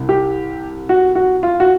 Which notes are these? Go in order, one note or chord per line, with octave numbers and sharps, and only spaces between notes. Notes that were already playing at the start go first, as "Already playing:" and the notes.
Already playing: C2 C3
G4
F#4
F#4
F4
F#4